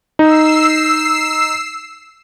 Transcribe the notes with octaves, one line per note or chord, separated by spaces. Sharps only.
D#4 E6 C7